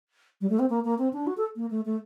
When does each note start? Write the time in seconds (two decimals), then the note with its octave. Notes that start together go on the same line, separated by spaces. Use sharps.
0.41 G3
0.50 A3
0.59 C4
0.70 A#3
0.84 A#3
0.98 C4
1.13 D4
1.27 F#4
1.37 A4
1.56 A#3
1.71 A3
1.85 A3